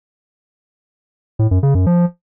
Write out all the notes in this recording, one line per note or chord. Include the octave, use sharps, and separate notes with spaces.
A2
F#2
C#3
F#2
F3